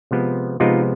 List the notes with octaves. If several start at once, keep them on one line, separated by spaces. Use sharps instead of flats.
C3 F3 G#3 B3
C3 F3 G#3 B3 D#4 F4